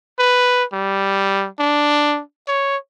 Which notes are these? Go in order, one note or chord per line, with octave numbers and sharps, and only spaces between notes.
B4
G3
D4
C#5